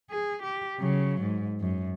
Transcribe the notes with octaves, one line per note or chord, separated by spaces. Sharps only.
G#4
G4
C#3 F#3
G#2
F#2